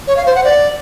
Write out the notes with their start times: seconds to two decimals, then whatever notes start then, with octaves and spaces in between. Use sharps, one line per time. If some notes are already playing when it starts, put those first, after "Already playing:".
0.07 C#5
0.17 F5
0.26 C5
0.35 F#5
0.44 D5